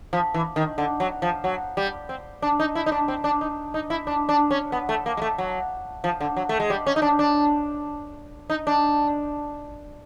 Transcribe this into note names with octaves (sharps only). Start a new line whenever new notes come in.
F3
E3
D#3
D3
F#3
F3
F#3
G3
C4
D4
D#4
E4
D#4
D4
C4
D4
D#4
D#4
E4
D4
D4
C#4
B3
A3
A#3
G#3
A3
F#3
F3
D3
F#3
A3
G#3
G3
C#4
D#4
D4
D4
D#4
D4